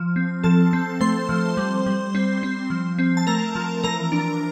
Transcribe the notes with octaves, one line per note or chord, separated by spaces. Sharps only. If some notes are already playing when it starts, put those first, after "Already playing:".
Already playing: F3
C4
F3 A4 A5
C4
A3 C5 C6
F3
G3
G3
C4
C4
F3
C4
A5
A3 A#4 A#5
F3
E3 A#4 A#5
D4